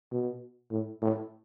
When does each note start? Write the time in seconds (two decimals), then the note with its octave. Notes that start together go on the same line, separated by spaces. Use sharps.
0.12 B2
0.71 A2
1.02 A2